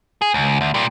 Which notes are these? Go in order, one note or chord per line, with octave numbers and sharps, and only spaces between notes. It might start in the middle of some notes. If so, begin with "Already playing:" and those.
G#4
C#2
D2
A#2 G3